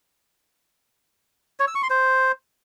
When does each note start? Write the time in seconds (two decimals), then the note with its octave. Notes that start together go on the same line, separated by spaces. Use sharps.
1.60 C#5
1.67 E6
1.75 C#6
1.83 C6
1.90 C5